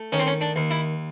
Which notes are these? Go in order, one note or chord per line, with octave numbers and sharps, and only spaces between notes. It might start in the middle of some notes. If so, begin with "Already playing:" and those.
Already playing: A3
D#3 C#4
C4
C#4
D4
D#2
E4